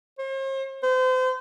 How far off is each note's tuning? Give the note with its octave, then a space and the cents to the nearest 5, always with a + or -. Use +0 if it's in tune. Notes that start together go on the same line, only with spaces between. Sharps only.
C5 +45
C5 -35